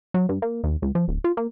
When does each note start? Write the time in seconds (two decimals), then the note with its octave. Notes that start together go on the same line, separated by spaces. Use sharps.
0.14 F#3
0.29 G2
0.42 A#3
0.64 D#2
0.82 C#2
0.95 F3
1.08 D1
1.24 F4
1.37 A#3